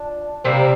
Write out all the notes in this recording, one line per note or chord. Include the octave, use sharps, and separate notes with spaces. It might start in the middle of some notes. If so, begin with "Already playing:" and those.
Already playing: D4 F4
C3 G3 A#3 C4 E4